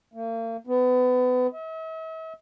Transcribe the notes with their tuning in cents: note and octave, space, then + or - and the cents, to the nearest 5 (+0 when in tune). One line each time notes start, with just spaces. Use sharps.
A#3 -40
B3 +30
E5 -45